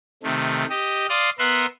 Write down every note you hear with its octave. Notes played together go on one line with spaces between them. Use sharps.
C3 D#3 A3
G4 D#5
D5 F5 C6 D#6
B3 A#4 B4 E5 F#5 C6